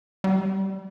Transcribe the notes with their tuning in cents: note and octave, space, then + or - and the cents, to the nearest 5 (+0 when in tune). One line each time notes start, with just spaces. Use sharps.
G3 -20